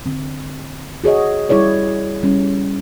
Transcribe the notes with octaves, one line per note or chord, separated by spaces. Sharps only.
D3 C4
F#4 G#4 C#5 D#5
G3 E4 G#4 C#5 D5
G3 C#4